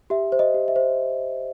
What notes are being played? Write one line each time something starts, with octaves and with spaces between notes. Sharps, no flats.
G4 E5
C5
D#5
G4
E5
C5